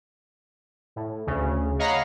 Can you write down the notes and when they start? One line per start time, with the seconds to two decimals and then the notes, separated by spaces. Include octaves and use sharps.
0.96 A2
1.27 D2 C#3
1.79 C#5 D#5 F5 F#5 A#5 B5